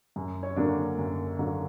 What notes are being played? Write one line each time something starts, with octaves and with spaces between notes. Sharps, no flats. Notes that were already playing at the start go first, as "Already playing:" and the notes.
F#2
C#5
D3 F#3 A#3 D4
F#2
D3 F#3 A#3 D4